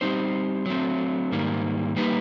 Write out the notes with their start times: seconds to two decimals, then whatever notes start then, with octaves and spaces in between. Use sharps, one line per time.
0.01 G3 C4 D#4 G4 C5
0.66 F#3 A3 C4
1.32 G#2 D#3 G3 A#3
1.96 G3 A#3 D#4 G4 B4